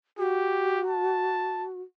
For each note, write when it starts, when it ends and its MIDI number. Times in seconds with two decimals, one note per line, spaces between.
0.18 1.80 66
0.18 0.80 67
0.87 1.64 81